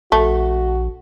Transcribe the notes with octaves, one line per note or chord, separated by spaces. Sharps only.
A#1 A3 F#4